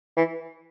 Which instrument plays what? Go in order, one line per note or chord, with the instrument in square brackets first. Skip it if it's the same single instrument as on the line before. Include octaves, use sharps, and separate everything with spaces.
[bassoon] E3